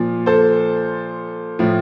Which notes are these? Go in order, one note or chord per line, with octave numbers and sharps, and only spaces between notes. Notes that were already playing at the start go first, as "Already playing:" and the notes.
Already playing: A#2 F3
A4 C5
A2 F3